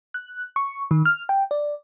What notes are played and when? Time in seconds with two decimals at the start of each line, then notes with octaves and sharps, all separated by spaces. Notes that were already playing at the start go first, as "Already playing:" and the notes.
0.14 F#6
0.56 C#6
0.91 D#3
1.05 F6
1.29 G5
1.51 D5